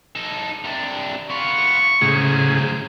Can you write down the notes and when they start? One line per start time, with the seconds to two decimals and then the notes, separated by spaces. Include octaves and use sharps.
0.15 D#4 A4
0.64 C3 D4
1.30 B3 F4 C#6
2.02 A2 C#3 F#3 G#4 C5